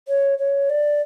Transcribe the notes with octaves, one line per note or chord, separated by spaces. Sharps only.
C#5
C#5
D5